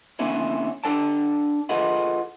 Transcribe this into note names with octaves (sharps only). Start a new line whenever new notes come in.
D3 A#3 C4 C#4 E4 C#5
D4 A4 D5 G5 A5
F4 G#4 A4 B4 D#5 F#5